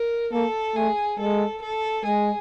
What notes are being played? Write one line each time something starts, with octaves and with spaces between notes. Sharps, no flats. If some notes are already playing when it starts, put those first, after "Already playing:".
Already playing: A#4
A#3 A4
A3 G#4
G#3 A4
A4
G#3 G#4